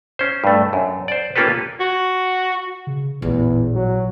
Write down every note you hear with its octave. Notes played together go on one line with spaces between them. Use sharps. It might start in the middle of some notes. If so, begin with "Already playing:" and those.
C#4 C5
G2 A3
F#2
C5 D5
A#3 C#4 F4 G4 A4 B4
F#4
C#3
A1 E2 A#2
F#3